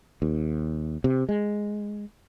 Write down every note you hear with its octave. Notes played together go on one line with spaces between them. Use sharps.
D#2
C3
G#3